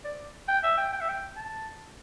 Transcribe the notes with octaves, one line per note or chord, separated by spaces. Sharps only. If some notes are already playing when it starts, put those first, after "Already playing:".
D5
G5
E5
G5
G5
E5
G5
A5